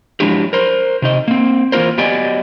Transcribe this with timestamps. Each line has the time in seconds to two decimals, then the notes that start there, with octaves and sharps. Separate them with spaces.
0.20 F3 F#3 G#3 D4 E4 G4
0.53 A#4 C5
1.02 C3 D#4 D#5
1.28 A#3 C4
1.72 E3 A#3 C#4 F4 A#4 C5
1.98 F#3 B3 G4 D5 D#5 G#5